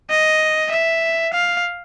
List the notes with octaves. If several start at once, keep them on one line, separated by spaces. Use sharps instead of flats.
D#5
E5
F5